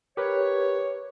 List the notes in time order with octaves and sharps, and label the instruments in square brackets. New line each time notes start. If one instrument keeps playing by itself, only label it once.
[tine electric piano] G4 A#4 B4 [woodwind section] C#5